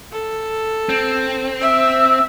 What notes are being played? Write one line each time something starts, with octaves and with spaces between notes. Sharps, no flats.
A4
C4
E5 E6